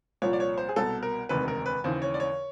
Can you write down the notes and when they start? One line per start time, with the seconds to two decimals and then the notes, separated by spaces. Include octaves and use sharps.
0.22 C2 A#2 F3 C#5
0.33 D5
0.40 C#5
0.58 C5
0.69 G#4
0.76 C2 B2 A4
1.03 A#4
1.29 E1 D2 C3 D#3 B4
1.48 A#4
1.66 B4
1.84 D#2 C#3 E3 C5
2.02 C#5
2.14 D5
2.20 C#5